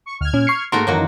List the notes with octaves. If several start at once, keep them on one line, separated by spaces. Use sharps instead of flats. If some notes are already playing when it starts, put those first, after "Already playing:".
C#6
D2 F6 G#6
A#2 C#4
C#6 C7 C#7
G#2 A3 A#3 F#4 A#4 C6
F#2 D#3 E3 F#3 A#3 F#4